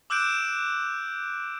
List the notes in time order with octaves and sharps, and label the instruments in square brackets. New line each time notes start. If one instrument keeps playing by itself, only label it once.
[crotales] D6 E6 F#6 G6 D7 E7